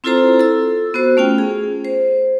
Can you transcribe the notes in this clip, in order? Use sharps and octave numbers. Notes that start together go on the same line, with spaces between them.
C4 E4 F4 A4 C5 A#5
A4 E6
B3 F#4 C5
A3 C#4 F4 G5
G#4
C5